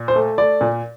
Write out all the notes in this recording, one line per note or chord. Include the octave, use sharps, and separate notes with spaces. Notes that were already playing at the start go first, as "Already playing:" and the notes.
Already playing: A#2
C5
A3
A3 D5
A#2